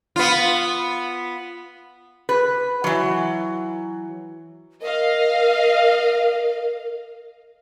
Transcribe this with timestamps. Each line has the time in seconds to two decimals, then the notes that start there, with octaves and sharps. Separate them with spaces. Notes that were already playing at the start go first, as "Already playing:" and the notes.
0.16 B3 F4
2.29 B4
2.84 E3 F#3
4.81 A#4 D#5 F5